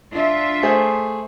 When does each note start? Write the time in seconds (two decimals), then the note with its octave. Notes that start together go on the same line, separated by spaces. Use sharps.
0.12 D4 F4 E5
0.63 A3 G#4 C5